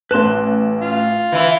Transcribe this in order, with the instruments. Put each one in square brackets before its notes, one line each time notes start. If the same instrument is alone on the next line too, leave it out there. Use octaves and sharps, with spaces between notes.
[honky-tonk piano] A1 F#6 [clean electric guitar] B4 A5 C6
[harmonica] F4
[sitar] E3 E4